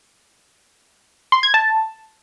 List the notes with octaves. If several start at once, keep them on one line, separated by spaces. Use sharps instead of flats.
C6
G#6
A5